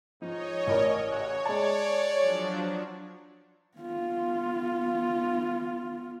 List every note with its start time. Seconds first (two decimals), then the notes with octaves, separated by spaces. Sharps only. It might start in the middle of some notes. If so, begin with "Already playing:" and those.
0.22 G#2 F3 D#4 C#5 D#5
0.67 A1 A#4 D5
1.09 C#3 E3 F#4 C#5
1.46 G#3 D5 A5
2.17 F3 F#3 D4
3.78 B3 F4